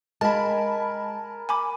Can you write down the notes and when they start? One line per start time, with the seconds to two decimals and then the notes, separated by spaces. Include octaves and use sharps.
0.21 G#3 A#4 G#5 A5 B5
1.49 G#5 B5 D6